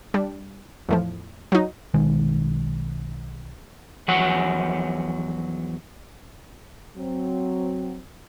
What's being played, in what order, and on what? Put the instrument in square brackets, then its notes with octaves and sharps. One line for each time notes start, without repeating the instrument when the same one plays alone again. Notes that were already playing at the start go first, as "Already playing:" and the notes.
[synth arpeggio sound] G3 D4
E2 A2 F3
F#3 D#4
[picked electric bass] B1 D#3 G#3
[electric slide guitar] E2 F3 F#3 F#4 C#5 F#5
[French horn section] F#3 C4